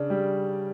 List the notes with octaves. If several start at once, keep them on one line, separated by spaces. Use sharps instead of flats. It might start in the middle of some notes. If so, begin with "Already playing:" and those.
Already playing: C#3 D4
G3